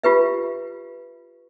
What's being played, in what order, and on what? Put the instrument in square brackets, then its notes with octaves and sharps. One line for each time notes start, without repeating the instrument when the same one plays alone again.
[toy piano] F4 G4 B4 E5